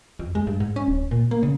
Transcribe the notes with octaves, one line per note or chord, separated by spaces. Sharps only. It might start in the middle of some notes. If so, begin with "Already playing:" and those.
F2
G#3
G2
G#2
C#4
D1
A#2
A#3
C#3